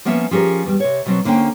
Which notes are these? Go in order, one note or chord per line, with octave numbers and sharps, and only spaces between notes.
F3 A#3 B3 C#4 E5
F3 C#4 G4 G#4 A#4
E2 G3
C3 C#5
B2 F#3 C4
D2 D3 A#3 C#4 C5 G5